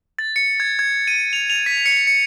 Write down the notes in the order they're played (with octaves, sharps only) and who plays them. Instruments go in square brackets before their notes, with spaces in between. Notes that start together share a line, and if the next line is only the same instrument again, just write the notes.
[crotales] A6
C#7
G#6
G#6
D#7
F7
F7
B6
C#7
C#7